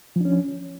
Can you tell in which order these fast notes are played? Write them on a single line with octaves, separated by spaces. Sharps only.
F3 D4 C#4